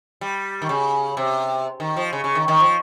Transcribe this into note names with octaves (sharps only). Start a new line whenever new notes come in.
G3
D#3
C#3
C3
D#3
F3
C#3
C#3
D#3
D#3
F3